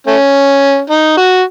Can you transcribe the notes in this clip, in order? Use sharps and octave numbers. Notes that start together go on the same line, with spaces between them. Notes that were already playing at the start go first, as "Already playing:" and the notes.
A3 C#4
D#4
F#4